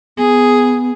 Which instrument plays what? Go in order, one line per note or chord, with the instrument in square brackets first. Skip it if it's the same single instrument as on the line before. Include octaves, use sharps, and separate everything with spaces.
[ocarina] B3 [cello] G#4